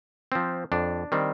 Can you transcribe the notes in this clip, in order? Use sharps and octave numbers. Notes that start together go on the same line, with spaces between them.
F3 C4
F2 D4
D#3 G3 C4